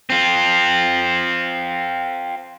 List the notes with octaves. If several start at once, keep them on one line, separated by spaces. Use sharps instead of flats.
C4 F4